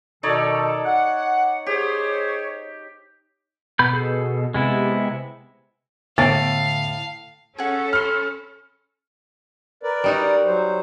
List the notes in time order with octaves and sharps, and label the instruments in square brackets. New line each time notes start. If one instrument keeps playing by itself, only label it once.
[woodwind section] B2 D#3 A4 [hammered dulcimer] D#4 C#5 D5
[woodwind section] F#5
[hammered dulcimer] G4 [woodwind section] G#4 C5 C#5
[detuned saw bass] B2 [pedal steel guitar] B3 B5 G6
[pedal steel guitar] G#4 A4
[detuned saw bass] C3 [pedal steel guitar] G#3 B3 E4
[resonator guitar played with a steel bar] A2 [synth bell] D3 [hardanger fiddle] F5 [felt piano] A6
[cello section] C#4 A4 [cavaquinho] G#4 F#5
[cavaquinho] B5 C6 [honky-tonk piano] F6
[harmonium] A#4 B4 D5
[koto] G3 D#4 F#4
[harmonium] F#3 C5